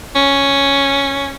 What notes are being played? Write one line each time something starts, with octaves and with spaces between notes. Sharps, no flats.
C#4